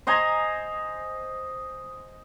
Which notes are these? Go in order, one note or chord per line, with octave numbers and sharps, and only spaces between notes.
C5 D#5 G#5 A#5